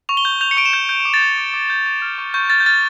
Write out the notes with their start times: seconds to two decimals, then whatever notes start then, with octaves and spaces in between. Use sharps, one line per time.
0.09 C#6 F7
0.17 G7
0.25 G6
0.41 G6 F7
0.51 C#7
0.57 C#6 D7
0.65 E7
0.73 G6
0.89 G6
1.05 D6
1.14 A6
1.22 G6
1.38 D6
1.54 D6
1.70 G6
1.86 C#6
2.02 F6
2.18 C#6
2.34 C#6 G6
2.50 F6 A6
2.60 G6
2.66 F6 A6